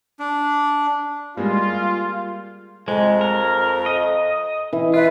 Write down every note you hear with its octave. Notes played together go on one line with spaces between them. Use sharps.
D4
G3 G#3 A#3 F4
F2 G#3
A#4
D#5
E3
F4 B4 E5